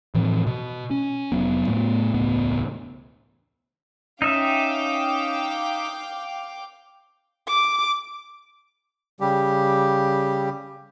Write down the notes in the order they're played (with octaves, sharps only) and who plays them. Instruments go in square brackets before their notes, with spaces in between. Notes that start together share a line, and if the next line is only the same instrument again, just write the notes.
[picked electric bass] A2 E3 F3 C4
B2
C#4
F1 F#3 B3
A2 A3 B3
E1 C#2 A2 B3
[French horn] C#4 [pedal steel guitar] D#4 E5 [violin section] F5 G5 D6
[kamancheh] D6
[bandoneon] C#3 G3 G4